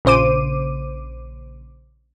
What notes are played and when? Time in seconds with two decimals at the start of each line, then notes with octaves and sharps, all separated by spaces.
0.05 A#1 C#3 C5 D6 D#7